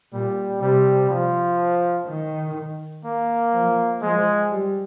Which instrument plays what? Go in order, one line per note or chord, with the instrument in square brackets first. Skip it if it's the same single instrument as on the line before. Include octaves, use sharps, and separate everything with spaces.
[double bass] A#2 [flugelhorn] G3
[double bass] C3 [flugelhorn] G3
[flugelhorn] F3
[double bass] D#3
[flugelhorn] A#3
[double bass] F3
[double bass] F3 [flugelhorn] G#3
[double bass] G3